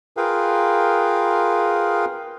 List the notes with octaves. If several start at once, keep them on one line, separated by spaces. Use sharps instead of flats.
F4 G#4 A#4 B4 F5 G5